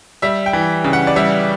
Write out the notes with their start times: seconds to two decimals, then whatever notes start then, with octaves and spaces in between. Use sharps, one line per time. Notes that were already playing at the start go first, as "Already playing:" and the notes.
0.22 G3 E5
0.46 G5
0.53 E3
0.84 C#3
0.93 F#5
1.07 D5
1.16 G3 E5